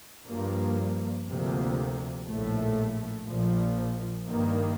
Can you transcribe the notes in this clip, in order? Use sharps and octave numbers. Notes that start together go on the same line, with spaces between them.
G2 F3 A#3
D2 C3 F3 A#3
A#1 A2 A3
A#1 A#2 F3
G2 D#3 A#3